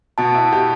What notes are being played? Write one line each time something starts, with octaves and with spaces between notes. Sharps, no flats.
B2 A5
E4
G4